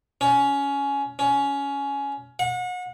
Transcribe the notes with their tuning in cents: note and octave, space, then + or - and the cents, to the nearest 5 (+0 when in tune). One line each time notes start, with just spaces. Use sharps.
C#4 +15
C#4 +15
F#5 -35